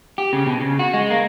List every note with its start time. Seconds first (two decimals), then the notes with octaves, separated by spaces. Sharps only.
0.18 G4
0.33 C#3
0.46 B2
0.60 C#3
0.79 F#4
0.93 G#3
1.10 A#3